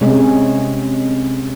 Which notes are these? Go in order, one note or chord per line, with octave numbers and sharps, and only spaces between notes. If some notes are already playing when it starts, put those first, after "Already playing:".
C3 G#3 C#4